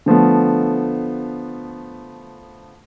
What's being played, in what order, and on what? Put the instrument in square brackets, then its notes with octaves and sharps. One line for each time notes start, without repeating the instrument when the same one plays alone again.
[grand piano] D3 F3 A3 B3